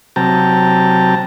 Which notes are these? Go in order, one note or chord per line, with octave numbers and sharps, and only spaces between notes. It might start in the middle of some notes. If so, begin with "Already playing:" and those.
C3 F#3 G5 A5 A#5